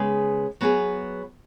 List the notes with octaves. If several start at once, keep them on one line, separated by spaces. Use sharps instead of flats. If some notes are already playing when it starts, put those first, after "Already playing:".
Already playing: C#3 G#3 B3 G#4 B4
F#3 B3 G#4 B4